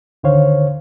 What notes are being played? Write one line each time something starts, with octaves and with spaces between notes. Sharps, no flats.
D2 D3 D#3 C5 C#5 F5